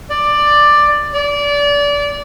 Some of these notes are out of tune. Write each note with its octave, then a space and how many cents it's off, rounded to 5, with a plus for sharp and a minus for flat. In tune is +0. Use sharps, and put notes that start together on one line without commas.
D5 +10
D5 -25